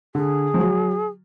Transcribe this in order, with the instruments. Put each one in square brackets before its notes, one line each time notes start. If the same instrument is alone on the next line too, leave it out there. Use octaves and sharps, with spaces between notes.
[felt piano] D3 [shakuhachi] G#4
[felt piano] F3
F#3